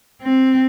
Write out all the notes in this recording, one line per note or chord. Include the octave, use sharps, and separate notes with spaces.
C4